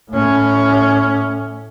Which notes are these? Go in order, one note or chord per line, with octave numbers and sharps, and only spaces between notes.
A2 C#4